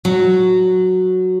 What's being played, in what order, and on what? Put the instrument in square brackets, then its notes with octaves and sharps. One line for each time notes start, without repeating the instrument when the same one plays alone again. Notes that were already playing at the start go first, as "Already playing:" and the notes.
[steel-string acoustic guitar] F#3